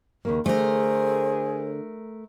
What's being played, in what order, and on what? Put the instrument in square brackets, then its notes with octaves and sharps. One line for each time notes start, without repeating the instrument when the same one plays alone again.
[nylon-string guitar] D#2 C#3 A#3
[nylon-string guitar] D3 [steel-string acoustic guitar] A3 A#4 [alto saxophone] G#4 [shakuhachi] C5